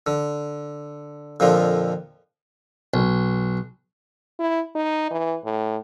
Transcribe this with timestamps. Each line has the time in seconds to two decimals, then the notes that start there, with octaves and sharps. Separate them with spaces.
0.07 D3
1.40 F2 A#2 D3 F3
2.94 B1
4.39 E4
4.75 D#4
5.11 E3
5.45 A2